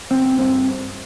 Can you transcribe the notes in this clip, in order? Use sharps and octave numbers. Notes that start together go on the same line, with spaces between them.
G1 C4
G2 C4